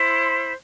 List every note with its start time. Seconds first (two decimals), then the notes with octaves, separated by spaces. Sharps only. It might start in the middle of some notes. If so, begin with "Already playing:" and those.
Already playing: E4 C5 C6